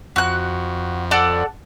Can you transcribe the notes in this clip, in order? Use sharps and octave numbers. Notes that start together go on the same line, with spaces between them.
F2 F#4 F#6
A4 D5 F#5